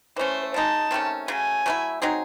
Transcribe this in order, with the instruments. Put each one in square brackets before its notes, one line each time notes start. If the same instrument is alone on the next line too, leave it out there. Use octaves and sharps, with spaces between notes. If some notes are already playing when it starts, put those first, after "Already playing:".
[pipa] E3 A3 C#4 [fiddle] C5
[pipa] C#3 G#3 D#4 [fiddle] A5
[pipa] C3 D#3 A3 C#4
[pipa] C#3 F#3 A3 [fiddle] G#5
[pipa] F#3 A3 C#4 E4
F#3 C4 D#4 G#4